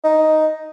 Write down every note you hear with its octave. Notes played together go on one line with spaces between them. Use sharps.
D#4